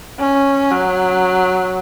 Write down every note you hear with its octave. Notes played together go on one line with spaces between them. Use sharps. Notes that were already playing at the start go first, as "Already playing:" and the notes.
C#4
F#3